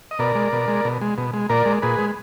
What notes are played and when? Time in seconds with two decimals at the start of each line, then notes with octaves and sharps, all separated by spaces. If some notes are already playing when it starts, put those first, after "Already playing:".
0.11 D#5
0.19 B2 A#4 D5
0.35 G#3
0.53 B2
0.68 G#3
0.85 B2
1.01 G#3
1.18 B2
1.34 G#3
1.49 A#2 A#4 D5
1.66 G#3
1.82 A#2 G#4 B4
1.98 G#3